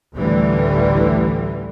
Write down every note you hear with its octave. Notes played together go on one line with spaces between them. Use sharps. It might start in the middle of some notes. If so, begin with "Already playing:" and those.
A1 D2 D3 E3 G3